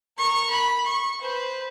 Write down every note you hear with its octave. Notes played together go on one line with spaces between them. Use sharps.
A#4 C#6
B5
C#6
B4 C5